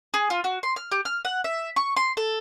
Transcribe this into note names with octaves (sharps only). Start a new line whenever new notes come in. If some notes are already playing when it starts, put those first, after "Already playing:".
G#4
F4
F#4
C6
F6
G4
F6
F#5
E5
C#6
C6
A4